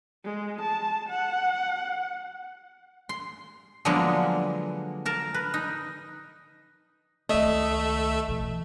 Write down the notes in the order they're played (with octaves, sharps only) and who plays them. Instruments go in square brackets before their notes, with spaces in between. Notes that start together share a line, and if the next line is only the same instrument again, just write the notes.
[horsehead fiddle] G#3
A5
F#5
[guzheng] C6
D3 F3 F#3 G#3 A#3 B3
A#4 A5
B4
D#4
[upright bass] C#2 D#3 [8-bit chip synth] A3 E5 [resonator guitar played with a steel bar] D#5
[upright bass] B2 E3